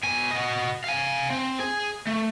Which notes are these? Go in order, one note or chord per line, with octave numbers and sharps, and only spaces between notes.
B2 G#5
F#4 D#5
F5 G#5
C4
G#4 G#5
A3